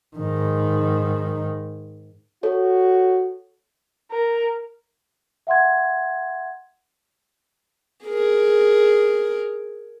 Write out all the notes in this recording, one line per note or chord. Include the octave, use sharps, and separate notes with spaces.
G#2 D#3
F#4 A4 C#5
A#4
E5 F#5 C6 G#6
G#4 A#4